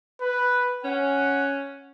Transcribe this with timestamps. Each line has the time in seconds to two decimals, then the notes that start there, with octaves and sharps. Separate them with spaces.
0.21 B4
0.84 C#4 F#5